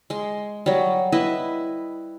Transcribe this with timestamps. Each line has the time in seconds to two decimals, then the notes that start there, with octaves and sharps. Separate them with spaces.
0.10 G#3 C6
0.66 F#3 G3
1.12 E4 B4 D#5